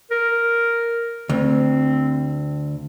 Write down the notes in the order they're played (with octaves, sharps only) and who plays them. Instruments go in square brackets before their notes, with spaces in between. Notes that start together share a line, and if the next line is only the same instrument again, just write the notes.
[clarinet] A#4
[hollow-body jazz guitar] D2 [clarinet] C4